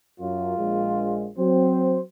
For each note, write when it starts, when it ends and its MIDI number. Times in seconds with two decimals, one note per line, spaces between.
0.20 0.56 42
0.20 1.29 65
0.57 1.26 34
0.57 1.26 56
1.38 1.97 54
1.38 1.97 60
1.38 2.01 72